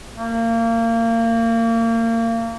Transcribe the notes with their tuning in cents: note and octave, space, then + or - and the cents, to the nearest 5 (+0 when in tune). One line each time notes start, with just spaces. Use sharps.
A#3 -30